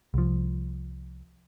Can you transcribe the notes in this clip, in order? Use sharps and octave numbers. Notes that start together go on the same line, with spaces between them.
C2 F3